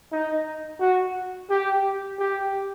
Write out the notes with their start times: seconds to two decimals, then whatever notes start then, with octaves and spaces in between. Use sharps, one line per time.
0.12 D#4
0.80 F#4
1.50 G4
2.19 G4